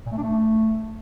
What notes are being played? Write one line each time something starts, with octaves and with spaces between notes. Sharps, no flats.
A#2
A3
D4
A3